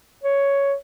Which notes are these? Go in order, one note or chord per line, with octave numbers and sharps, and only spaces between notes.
C#5